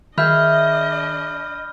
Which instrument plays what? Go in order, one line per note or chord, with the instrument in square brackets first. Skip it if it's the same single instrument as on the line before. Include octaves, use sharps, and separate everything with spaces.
[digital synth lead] D#3 [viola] D4 D#5 [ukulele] G#4 E5 [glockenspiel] B5 F6 G6